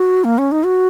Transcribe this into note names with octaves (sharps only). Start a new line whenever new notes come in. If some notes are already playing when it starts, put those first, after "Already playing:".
Already playing: F#4
A#3
C#4
D#4
F#4